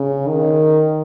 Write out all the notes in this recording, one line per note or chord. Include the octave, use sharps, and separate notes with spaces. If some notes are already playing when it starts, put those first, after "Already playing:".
Already playing: C#3
D#3